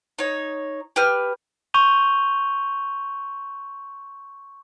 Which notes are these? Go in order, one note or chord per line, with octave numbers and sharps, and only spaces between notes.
D#4 C#5
G4 B4 F6
C6 C#6 G6 D#7 F7 G7